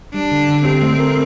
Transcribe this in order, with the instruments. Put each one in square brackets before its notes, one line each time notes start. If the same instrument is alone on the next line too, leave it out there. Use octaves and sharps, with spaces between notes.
[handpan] G3 [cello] D4
[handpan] D3
D3
[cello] C4 [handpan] G4
[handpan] A3
A#4